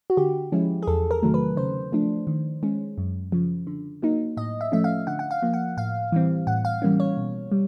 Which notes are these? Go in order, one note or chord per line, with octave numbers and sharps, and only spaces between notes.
F#4
D3 G4
F3 G#3 C#4 E4
G#4
E2 A4
A#4
C3 D#3 F#3 A3
B4
C#3 C5
F3 A3 D4
D#3
G#3 C#4
F#2
C#3 F3
D3
F#3 A#3 D#4
A2 D#5
E5
F3 A3 C#4 E5
F5
D3 F#5
F#5
F5
F3 A#3
F#5
A2 F5
E3 G3 C4
A2 F#5
F5
E3 G3 A#3 C#4
C#5
B2
G3